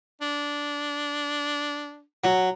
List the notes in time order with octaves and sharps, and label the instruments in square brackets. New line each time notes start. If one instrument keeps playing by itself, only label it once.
[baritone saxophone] D4
[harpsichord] F#3